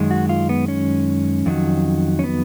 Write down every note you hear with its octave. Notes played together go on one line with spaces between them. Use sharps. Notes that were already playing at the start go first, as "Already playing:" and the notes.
Already playing: F#2 D#3 G#3
F#4
F4
B3
C#4
F2 D#3 F#3
C#4
B3